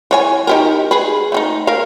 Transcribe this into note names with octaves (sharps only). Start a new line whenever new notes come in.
E3 C#5 G#5
D#4 G4 A#4
G#4 B4
A3 C#4 D#4
A#4 F5